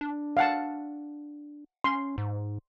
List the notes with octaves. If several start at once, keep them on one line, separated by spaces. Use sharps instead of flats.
D4
F5 F#5 A5
C#4 C6
G#2